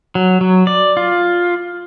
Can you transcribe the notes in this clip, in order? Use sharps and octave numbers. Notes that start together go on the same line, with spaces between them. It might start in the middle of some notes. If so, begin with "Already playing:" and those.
F#3
F#3
D5
F4